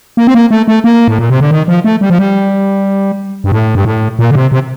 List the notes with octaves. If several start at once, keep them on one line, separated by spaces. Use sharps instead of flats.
A#3
C4
A#3
A3
A3
A#3
A2
A#2
C3
D3
D#3
F3
A3
G3
F3
G3
G2
A2
G2
A2
A#2
D3
C3
C3